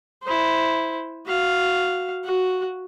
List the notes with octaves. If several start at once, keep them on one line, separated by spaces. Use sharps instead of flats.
E4 C5
F#4 F5
F#4